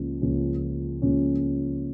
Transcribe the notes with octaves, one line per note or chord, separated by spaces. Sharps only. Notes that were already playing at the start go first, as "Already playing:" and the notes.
Already playing: C#2 C#3 F3 A#3 C#4
C#2 C#3 F3 A#3 C#4
C#2 C#3 F3 A#3 C#4